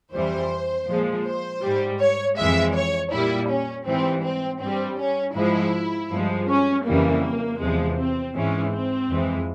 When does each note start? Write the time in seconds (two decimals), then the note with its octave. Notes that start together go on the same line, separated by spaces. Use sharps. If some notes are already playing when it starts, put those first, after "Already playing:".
0.14 F2 E3 G3 C5
0.88 A#2 F3 G#3
1.25 C5
1.63 G#2 G3
2.00 C#5
2.38 F2 E3 G#3 E5
2.74 C#5
3.12 A#2 G3 E4
3.50 C#4
3.86 G#2 E3 G3 C4
4.24 C4
4.61 G2 G3 C4
4.99 C#4
5.36 G#2 F3 G#3 E4
6.10 G2 F3 G#3
6.48 C#4
6.86 F2 C#3 E3 G3 A#3
7.60 E2 C3 F3 G#3
7.97 C4
8.34 G#2 E3 G#3 C#4
8.72 C4
9.09 F2 E3 G#3